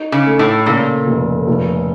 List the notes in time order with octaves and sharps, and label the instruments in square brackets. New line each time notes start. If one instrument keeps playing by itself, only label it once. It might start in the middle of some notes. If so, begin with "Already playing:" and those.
Already playing: [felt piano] D#4
[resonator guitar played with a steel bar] C#3
[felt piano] A3
[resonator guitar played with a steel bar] A2
[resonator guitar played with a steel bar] A#2 [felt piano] C#3
[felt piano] F1
F1